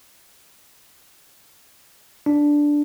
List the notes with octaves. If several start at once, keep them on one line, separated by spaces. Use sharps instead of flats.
D4